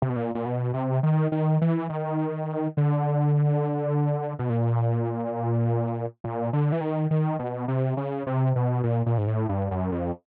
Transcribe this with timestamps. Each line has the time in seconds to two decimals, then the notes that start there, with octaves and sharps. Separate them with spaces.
0.02 C3
0.09 B2
0.16 A#2
0.35 A#2
0.46 B2
0.74 C3
1.03 D#3
1.32 D#3
1.61 E3
1.89 D#3
2.77 D3
4.39 B2
4.49 A#2
6.24 A#2
6.53 D3
6.72 E3
6.81 D#3
7.11 D#3
7.39 B2
7.68 C3
7.97 C#3
8.27 C3
8.56 B2
8.84 A#2
9.06 A#2
9.18 G#2
9.27 A2
9.49 G2
9.71 F#2
9.92 F2